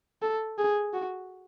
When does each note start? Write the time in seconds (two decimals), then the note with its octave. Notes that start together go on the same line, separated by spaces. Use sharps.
0.22 A4
0.58 G#4
0.93 F#4